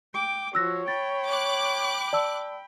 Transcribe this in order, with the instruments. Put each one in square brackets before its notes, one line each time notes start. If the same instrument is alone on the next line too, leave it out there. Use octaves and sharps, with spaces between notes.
[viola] G5 D6
[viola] F3 F#4 [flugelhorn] C#5 [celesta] E6 F#6 A#6
[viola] G5 B5 [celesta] A6
[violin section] D6 F#6
[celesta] D5 A5 E6